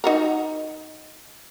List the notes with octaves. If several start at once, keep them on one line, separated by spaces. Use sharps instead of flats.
D#4 F#4 A#4